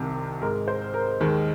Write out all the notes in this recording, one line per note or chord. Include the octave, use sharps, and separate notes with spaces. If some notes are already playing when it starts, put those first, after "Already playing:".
Already playing: C2 C3 D#3
G#2 G#3 A#4
C5
A#4
D#2 D#3 G#3